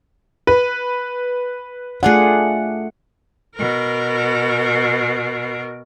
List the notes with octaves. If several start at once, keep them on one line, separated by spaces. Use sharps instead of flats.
B4
A3 D4 F4 G#4 F#5
B2 A#4